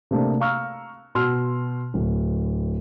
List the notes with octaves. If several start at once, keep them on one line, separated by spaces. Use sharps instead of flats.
C3 A3 A#3 D4
F5 A#5 C#6 E6 F6
B2 C6 E6 F6
D1